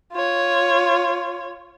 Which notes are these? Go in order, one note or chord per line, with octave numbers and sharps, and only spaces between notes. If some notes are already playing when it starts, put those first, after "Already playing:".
F4 C#5